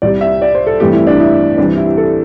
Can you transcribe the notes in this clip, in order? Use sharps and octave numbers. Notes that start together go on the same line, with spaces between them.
C2 C3 G3 D5
E5
D5
C5
A4
G2 E3 A3 C4 G4
E4
D4
E4
C2 C3 E3 G3 C4 D4
E4
A4